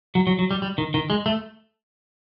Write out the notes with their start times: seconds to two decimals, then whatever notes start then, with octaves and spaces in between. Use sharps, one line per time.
0.15 F#3
0.27 F#3
0.39 F#3
0.51 G3
0.62 G3
0.78 D#3
0.94 D#3
1.10 G#3
1.26 A3